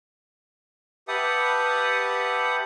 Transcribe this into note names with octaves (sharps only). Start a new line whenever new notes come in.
G4 B4 E5 F#5 A5 D#6